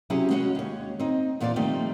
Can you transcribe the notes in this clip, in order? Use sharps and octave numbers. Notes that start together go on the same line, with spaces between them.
C3 F#3 C#4 E4 G4 G#4
G#3 C#4 F#4 C#5 F#5
D#2 C#5
C4 D#4
E2 A#2 F4 A4 C5 D5
D#3 F3 G3 A3 C4